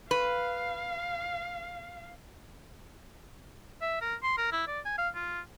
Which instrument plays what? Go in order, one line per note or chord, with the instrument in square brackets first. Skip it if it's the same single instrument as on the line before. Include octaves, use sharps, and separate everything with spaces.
[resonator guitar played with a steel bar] B4 [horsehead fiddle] F5
[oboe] E5
A#4
C6
A#4
E4
D5
G#5
F5
F4